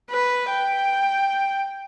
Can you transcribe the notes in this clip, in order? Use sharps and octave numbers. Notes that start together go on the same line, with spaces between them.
B4
G5